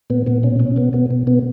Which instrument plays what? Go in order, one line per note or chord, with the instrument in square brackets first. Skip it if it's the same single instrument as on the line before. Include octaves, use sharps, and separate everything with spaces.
[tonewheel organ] A#2 B3
A#2 B3
B2 C#4
B2 C#4
B2 B3
B2 B3
B2
B2 B3